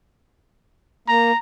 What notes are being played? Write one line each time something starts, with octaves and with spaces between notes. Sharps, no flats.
A#3 A#5